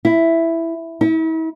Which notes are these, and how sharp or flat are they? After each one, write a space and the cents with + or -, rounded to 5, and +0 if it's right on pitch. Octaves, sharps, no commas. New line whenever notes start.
E4 +5
E4 -40